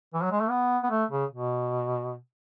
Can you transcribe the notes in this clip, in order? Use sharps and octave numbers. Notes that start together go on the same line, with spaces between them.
E3
F#3
G#3
A3
B3
B3
A3
C#3
B2